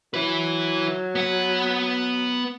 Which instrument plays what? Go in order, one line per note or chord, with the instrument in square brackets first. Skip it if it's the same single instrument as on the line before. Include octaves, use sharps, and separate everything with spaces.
[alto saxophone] F#3 [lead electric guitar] E4 B4
[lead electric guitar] B3 F#5